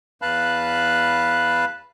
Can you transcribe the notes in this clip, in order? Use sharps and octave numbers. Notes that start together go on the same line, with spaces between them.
E2 B4 F5 A5 B5 F#6